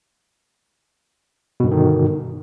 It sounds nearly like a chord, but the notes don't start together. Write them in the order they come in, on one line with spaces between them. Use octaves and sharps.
B2 G2 D3 D#3